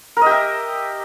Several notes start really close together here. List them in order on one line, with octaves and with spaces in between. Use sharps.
A#4 D#5 G4 E5